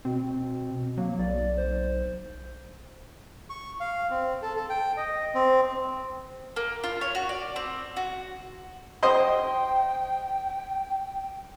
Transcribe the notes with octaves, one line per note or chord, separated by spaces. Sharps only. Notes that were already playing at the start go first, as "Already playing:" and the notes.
B2 C4
F#3 A#3
B1 D5
C5
C#6
F5
C4
A4
A4
G5
D#5
C4
A#3
F4
C#5
F#4
D5
C4
F#4
C5 D#5 G5 C6